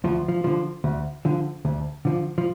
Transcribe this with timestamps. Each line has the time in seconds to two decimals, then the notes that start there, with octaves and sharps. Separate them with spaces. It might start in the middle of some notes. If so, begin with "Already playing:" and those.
0.04 D2 F3
0.28 F3
0.44 D3 F3
0.84 D2
1.25 D3 F3
1.65 D2
2.05 D3 F3
2.38 F3